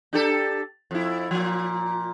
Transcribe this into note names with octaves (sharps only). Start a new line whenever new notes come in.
D4 G4 A4
F2 E4
A#2 F3